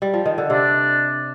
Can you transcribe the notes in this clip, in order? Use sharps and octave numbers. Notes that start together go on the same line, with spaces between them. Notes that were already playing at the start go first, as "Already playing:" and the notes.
G3
F3
D#3
D3
C3 D4